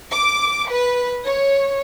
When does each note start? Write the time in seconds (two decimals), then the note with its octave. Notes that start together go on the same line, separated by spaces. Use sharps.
0.11 D6
0.68 B4
1.26 C#5